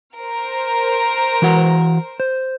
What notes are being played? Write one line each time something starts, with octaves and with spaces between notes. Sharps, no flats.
A#4 C5
E3 F#4 F#5
C5